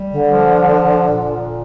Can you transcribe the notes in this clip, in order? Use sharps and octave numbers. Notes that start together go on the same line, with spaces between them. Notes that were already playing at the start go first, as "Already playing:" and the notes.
Already playing: G3
D3
F3
A#2